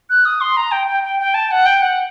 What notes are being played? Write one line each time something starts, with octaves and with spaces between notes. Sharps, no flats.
F#6
D#6
C6
A#5
G5
G5
G5
G5
A5
F#5
G5
F#5